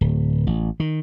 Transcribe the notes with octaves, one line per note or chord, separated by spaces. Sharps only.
D1
A1
D#3